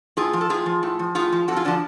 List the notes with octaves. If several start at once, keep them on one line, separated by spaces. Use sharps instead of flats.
A2 F4 G#4
F3
A4
A2 F4 G#4
F3
A2
F3
A2 F4 G#4
F3
F2 F#4 A4
F4 G#4
D3 F3 D4 F#4